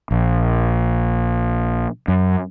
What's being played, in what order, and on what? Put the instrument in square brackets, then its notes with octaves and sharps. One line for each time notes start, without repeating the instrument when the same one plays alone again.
[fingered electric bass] A#1
F#2